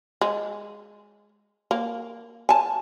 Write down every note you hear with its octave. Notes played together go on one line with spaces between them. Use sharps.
G#3
A#3
G#5 A5